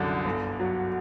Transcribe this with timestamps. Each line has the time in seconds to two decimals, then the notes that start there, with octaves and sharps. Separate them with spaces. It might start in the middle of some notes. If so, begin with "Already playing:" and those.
Already playing: C2 F#2 D3
0.25 G1
0.60 F#3